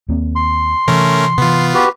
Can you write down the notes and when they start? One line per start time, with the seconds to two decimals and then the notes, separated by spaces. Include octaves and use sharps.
0.08 D#2 A#3 C4
0.36 C6
0.88 C3 E3 A3 C#4 A#4
1.38 C3 E3 B3 F4
1.74 F#4 G4 B4